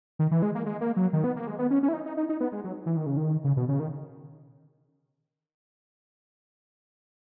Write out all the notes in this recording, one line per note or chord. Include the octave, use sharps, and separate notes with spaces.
D#3
E3
G#3
A#3
G#3
A#3
F#3
D#3
B3
A#3
G#3
B3
C#4
C#4
E4
D#4
D#4
D#4
D#4
B3
G#3
F#3
E3
D#3
C#3
D#3
C#3
B2
C#3
D#3